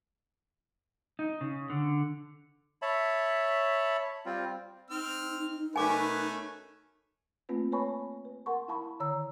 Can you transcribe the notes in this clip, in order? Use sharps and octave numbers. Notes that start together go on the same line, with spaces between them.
D#4
C#3
D3
C#5 E5 A5 B5
G3 C4 F4
C4 D#4 F6
B2 A3 C#4 A#4 B4 G#5 D6
A3 A#3 C4 F4 B4
B4 C#5 G#5 A5 B5 C#6
B4
A#4 F#5 A5 C6 C#6
E4 F5 A5 B5 C#6
D3 D#3 C#5 A#5 E6